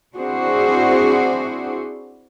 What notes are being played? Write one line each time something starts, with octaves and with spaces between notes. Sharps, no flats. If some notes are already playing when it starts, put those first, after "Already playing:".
C4 D4 E4 F#4 G#4 C5